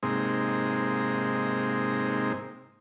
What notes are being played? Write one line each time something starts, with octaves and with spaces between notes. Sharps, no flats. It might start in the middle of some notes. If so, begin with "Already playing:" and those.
G#2 C3 G#3 A#3 C4 D#4